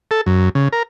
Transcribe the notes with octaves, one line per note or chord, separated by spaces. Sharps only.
A4
F#2
C#3
A#4